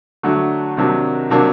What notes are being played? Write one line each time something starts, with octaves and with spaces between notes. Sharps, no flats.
D3 F#3 A3 D4
C3 D#3 F#3 A#3 D4
C3 D#3 F#3 A#3 D4